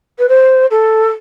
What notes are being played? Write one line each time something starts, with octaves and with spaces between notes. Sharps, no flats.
B4
C5
A4